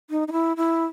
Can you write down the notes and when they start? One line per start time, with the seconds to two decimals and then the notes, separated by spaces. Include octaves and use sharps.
0.10 D#4
0.28 D#4
0.32 E4
0.57 E4